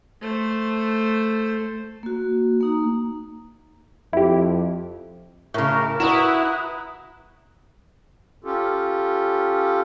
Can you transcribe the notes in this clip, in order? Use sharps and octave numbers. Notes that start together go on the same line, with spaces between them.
A3 C5
A#3 F#4
A#3 D#4 A#5
F2 E4 G4
A2 C#3 A#4 A5 D6
E4 F#4 B4 A#5 D#6 F#6 E7
C#4 F4 G4 A4